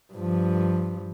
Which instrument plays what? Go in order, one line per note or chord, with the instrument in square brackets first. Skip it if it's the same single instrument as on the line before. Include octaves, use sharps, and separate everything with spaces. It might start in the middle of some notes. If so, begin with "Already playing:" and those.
[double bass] G2 F3